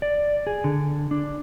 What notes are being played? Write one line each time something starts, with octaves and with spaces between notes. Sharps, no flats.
D5
G#4
D3
D4